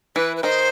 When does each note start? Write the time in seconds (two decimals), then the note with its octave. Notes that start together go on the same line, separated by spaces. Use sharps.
0.16 E3 E4 B4
0.37 B4
0.43 D#3 D#4 C5